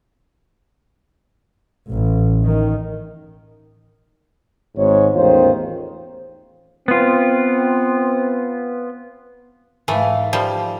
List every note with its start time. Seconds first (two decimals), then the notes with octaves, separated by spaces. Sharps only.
1.90 A1
2.43 D#3
4.76 G#1 G#2 C#5
5.15 A1 E2 D#3 F4 C5
6.88 B3 C4 F4
9.88 G#2 E3 A3 F5
10.33 F3 G3